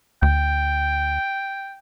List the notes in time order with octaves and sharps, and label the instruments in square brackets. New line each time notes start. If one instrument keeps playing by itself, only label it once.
[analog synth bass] D2 [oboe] G5